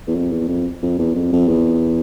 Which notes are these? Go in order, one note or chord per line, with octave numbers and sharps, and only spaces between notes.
E2
F2
E2
F2
F2
E2
F2
F2
E2